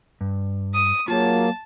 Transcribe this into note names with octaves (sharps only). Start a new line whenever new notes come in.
G2
D#6
F#3 A#3 F4 G#4 A5